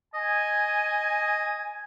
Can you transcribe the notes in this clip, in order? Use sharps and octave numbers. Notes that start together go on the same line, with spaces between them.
D#5 G#5